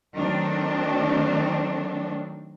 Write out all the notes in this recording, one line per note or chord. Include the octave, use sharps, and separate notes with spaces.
D#3 F#3 A3 C4 D4